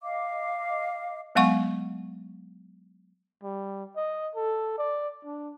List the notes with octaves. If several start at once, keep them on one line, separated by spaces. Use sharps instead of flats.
D#5 F5 D6
F#3 G#3 B3 F#5 C#6
G3
D#5
A4
D5
D4